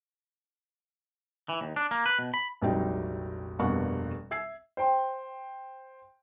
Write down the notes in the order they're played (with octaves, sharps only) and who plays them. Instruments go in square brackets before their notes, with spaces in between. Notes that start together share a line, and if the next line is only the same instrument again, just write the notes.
[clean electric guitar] E3
D#2
D4
A#3
B4
B2
B5
[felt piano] F1 A#1 F#3 G3 D#4 G5
F1 G2 B2 A#3 F#5 C#6
E5 E6 G#6 C7
[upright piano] C5 G5 C6